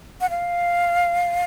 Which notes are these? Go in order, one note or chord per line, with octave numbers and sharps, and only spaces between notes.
F#5
F5